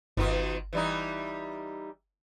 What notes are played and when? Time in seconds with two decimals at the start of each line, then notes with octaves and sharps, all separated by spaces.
0.17 G1 B2 D#3 F4
0.73 E3 G3 D#4